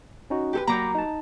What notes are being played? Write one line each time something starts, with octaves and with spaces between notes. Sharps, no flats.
C#4 D#4 F#4
G4 A4 B4
F#3 A#3 A#5 B5 D6 G6
D#4 A5